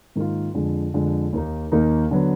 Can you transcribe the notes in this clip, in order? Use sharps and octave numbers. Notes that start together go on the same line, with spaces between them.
G#2 D#3 A#3 F4
F2 D3 G#3
F2 D3 G#3
D#2 D#3 A#3 D#4
D#2 D#3 A#3 D#4
D3 F#3 B3